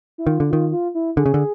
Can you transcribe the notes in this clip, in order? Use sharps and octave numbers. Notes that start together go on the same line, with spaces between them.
E4
D#3 F4
D3
D#3 F4
F4
E4
D3 G#4
C#3
D3